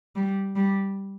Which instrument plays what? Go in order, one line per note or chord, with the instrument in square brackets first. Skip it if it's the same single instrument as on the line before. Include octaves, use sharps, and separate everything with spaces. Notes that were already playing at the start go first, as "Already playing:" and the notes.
[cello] G3
G3